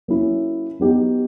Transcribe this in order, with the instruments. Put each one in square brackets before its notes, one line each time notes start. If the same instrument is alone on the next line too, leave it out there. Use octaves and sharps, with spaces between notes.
[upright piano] F#3 A#3 C#4 E4
F#3 B3 D#4 G4